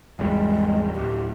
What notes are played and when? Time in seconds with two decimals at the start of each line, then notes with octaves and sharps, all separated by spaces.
0.19 G#1 E2 G3 G#3
0.95 D1 G4